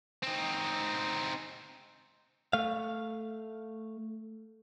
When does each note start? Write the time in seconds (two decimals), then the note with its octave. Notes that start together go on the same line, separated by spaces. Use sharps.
0.23 C4 D#4
2.53 A3 F5